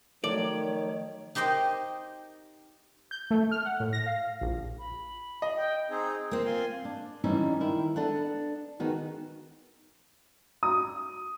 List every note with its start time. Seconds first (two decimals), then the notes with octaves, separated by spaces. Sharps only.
0.24 D#3 F3 F#3 A3 C#5 D5
1.35 D#4 G4 C5 D#5 G5
3.11 G6
3.31 A3
3.51 F6
3.65 F#5
3.80 A2
3.93 A#6
4.06 F5
4.41 A#1
4.79 B5
5.42 D#5
5.56 G5
5.90 C4 D#4 G#4
6.31 A#3 C4 C5
6.46 F4 G#5 C6
6.85 D4
7.24 E3 G3 C#4 D#4 E4
7.60 D#3 E4
7.96 B3 D4 A4 F#5
8.80 D#3 B3 F#4 G#4
10.63 D#6